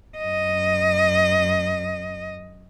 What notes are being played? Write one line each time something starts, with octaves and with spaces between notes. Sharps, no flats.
F#2 D#5